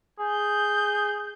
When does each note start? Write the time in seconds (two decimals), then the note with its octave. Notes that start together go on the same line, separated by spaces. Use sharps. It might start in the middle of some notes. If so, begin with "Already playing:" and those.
0.19 G#4 G6